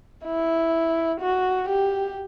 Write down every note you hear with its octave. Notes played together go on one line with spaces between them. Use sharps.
E4
F#4
G4